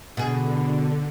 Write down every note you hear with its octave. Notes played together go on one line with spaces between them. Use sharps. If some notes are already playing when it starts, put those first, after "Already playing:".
B2 D3 G#4